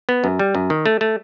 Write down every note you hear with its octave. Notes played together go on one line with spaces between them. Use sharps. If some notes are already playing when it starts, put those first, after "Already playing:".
B3
F#2
G3
F#2
D#3
A3
A3